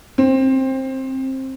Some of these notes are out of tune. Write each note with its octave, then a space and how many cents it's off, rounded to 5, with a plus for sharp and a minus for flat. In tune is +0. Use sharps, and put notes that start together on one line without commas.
C4 +15